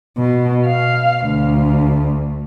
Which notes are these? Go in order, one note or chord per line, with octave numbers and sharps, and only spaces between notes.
B2
F5
D2